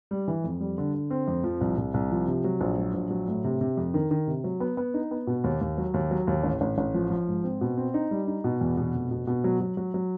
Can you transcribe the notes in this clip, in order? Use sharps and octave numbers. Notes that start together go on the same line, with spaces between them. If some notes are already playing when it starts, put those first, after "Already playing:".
G3
E3
F2
G3
D3
D3
C4
F2
F3
C2
C2
C2
F3
C3
F#3
A#1
F#3
A#1
F#3
A2
C3
C3
F2
D#3
D#3
C3
F#3
B3
B3
D#4
B3
B2
D#2
D#2
F#3
D#2
F#3
D#2
A1
A1
A1
F3
F3
G#2
C4
B2
C4
D#4
G3
D#4
B2
E2
B2
F1
B2
B2
F#3
F#3
F#3
F#3